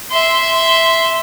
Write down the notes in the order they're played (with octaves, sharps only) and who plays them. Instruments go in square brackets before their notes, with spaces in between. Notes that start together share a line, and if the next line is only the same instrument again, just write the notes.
[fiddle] E5 C6